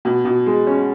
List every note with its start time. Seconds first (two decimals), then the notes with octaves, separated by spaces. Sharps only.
0.05 B2
0.25 B2
0.46 G#3
0.67 C#4